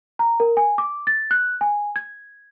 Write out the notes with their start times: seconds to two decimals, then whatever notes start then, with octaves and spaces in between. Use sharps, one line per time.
0.19 A#5
0.40 A#4
0.57 G#5
0.78 D6
1.07 A6
1.31 F#6
1.61 G#5
1.96 G#6